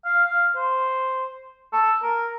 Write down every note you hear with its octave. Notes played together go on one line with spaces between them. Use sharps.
F5
F5
C5
A4
A#4